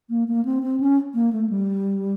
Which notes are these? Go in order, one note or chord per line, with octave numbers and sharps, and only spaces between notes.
A#3
A#3
C4
C4
C#4
A#3
A3
G3